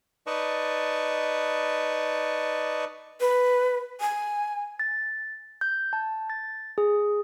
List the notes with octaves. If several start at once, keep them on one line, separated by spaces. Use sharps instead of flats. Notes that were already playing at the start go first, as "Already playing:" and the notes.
D#4 B4 D5 D#5 A5 C#6
B4
G#5
A6
G6
A5
A6
G#4